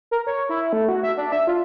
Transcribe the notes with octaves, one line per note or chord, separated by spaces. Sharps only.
A#4
C#5
E4
A3
F#4
E5
D4
E5
F4